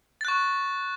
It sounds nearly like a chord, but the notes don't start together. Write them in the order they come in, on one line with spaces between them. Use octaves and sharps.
A6 F#6 C#6